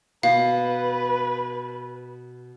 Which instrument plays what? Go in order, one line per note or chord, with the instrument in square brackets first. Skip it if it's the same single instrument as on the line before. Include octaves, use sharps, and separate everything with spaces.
[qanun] B2 [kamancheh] B4 [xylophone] F5